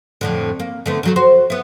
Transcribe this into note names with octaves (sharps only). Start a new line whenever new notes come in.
F2 A2 D3
A#3
D3 A3 B3
D3 F#3 A3
F#4 C5
B3 E4